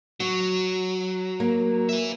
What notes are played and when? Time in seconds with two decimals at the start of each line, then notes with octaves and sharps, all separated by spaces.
0.20 F#3 F#4
1.40 A#3
1.89 B4 E5